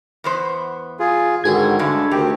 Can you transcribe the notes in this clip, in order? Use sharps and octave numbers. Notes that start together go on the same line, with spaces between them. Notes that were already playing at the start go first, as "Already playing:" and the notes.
E2 B3 C5
F4 G#4
G#2 D3 D#3 F#4 G#4 G#6
G2 D3 G#3 A3
D2 D#3 C4 G4